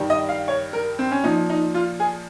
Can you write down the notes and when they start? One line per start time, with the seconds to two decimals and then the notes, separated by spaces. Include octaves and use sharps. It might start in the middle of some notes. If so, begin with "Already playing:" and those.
Already playing: G2 D#3 G3
0.10 D#5
0.29 F5
0.48 C#5
0.73 A#4
0.99 C4
1.11 C#4
1.24 A#2 F3 D#4
1.50 D#4
1.74 F4
2.00 G#4